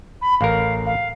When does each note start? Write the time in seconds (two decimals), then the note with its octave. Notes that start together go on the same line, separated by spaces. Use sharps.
0.21 B5
0.41 A1 A#4 F5
0.86 F5